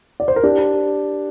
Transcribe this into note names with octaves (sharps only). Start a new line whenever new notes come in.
D5
C5
A#4
D4 G4